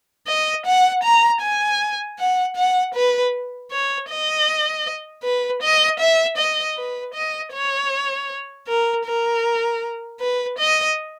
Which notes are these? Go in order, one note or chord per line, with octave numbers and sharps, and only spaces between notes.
D#5
F#5
A#5
G#5
F#5
F#5
B4
C#5
D#5
B4
D#5
E5
D#5
B4
D#5
C#5
A#4
A#4
B4
D#5